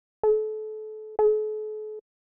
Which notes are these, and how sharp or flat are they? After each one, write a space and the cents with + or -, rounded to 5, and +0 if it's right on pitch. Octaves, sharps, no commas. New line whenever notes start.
A4 -30
A4 -45